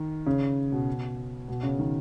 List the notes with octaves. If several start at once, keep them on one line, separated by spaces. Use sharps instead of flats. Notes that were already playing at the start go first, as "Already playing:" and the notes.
Already playing: D#3
C#3
B2
B2
C#3
D#3